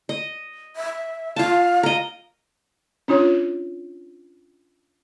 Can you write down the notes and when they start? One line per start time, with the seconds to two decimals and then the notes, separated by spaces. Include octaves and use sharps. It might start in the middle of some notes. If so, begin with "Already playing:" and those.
0.09 D#5
0.76 E5
1.36 F4 F5 A5
1.83 A#4 D#5
3.08 C#4 D4 F4 C#5